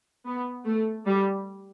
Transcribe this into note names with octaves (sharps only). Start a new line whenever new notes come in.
B3
A3
G3